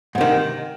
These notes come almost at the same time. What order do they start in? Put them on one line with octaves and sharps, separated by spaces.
G#2 C3 D#3